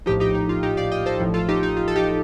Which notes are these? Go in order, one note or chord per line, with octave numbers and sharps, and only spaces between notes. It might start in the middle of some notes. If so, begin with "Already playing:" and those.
A#1 A2 F3 D#4 G4
D#4 G4
D#4
F4
D#4 G4
D5 F5
D#5 G5
A4 C5
A1 A2 F3
F4 A4
D#4 G4
D#4
F4
A4
D#4 G4